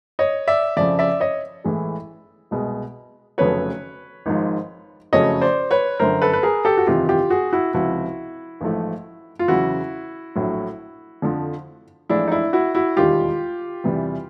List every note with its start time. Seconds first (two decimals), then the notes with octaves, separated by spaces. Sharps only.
0.19 C#5 D#5
0.48 D5 E5
0.77 F2 C#3 F3 D5 E5
0.99 D5 E5
1.20 C#5 D#5
1.64 A1 A2 E3 G#3
2.51 C2 B2 G#3
3.38 F1 F2 C#3 F#3 A3 B4 C#5
4.26 G#1 G#2 F3
5.13 F#1 F2 C#3 F#3 A3 C#5 D#5
5.42 C5 D5
5.71 B4 C#5
6.00 G1 F#2 D3 A#4 C5
6.22 A4 B4
6.33 B4
6.43 G#4 A#4
6.65 G4 A4
6.77 F#4
6.87 F#1 E2 C3 D#3 F4 G4
7.09 F4 G4
7.30 F#4 G#4
7.53 E4 F#4
7.74 C#2 C3 F3 E4 F#4
8.61 A1 G#2 F3 A3
9.39 F4
9.48 E2 C#3 F#3 E4 F#4
10.35 A#1 A2 F#3
11.22 F2 D3 F3
12.09 A1 A2 F3 G#3 D4 E4
12.28 D#4
12.31 D4 E4
12.53 E4 F#4
12.75 E4 F#4
12.96 E1 D#2 D#3 G3 F4 G4
13.84 E2 C3 E3 G3